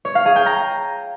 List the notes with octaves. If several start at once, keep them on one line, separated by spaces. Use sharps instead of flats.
C#5
F5
G#4
G5
A#5